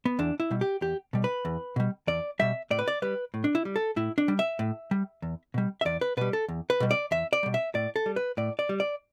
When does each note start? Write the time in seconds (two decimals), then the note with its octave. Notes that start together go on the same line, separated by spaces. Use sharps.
0.05 B3
0.19 E2 D4
0.40 E4
0.51 B2 G3
0.61 G4
0.81 E2 G4
1.13 B2 G3
1.24 B4
1.45 E2
1.76 B2 G3
2.07 E2 D5
2.39 B2 G3 E5
2.71 A2 D5
2.79 B4
2.88 D5
3.02 G3 B4
3.34 A2
3.44 D4
3.55 E4
3.65 G3
3.76 A4
3.96 A2 E4
4.18 D4
4.28 G3
4.39 E5
4.59 A2
4.91 G3
5.22 E2
5.54 B2 G3
5.81 E5
5.85 E2 D5
6.01 B4
6.17 B2 G3 B4
6.33 A4
6.49 E2
6.70 B4
6.80 B2 G3
6.91 D5
7.11 E2 E5
7.33 D5
7.43 B2 G3
7.54 E5
7.75 A2 D5
7.96 A4
8.06 G3
8.16 B4
8.37 A2 D5
8.59 D5
8.69 G3
8.80 D5